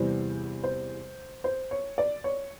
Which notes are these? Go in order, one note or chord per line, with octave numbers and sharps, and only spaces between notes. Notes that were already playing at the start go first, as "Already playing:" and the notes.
Already playing: E2 C3 E3 G3 C5
C5
C5
C#5
D5
C#5